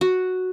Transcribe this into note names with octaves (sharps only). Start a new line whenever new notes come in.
F#4